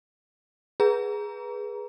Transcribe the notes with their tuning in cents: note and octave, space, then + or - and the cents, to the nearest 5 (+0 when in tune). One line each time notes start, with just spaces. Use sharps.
G#4 +0 B4 -15 A#5 +15